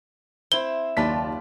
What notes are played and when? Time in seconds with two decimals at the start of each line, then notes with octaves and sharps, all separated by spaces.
0.52 C4 E4 C5 G7
0.97 F#1 D#2 F4 B4 D5 A5 B6